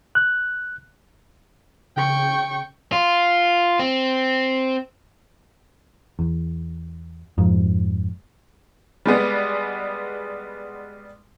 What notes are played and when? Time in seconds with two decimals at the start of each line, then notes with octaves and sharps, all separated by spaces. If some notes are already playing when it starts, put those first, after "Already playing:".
0.15 F#6
1.97 C#3 G5 C#6
2.92 F4
3.79 C4
6.19 E2
7.38 F2 G#2
9.06 G3 G#3 B3